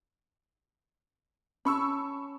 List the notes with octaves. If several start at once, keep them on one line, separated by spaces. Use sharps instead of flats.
C#4 A5 B5 C#6 E6